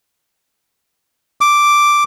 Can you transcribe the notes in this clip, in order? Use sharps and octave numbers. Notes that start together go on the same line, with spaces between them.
D6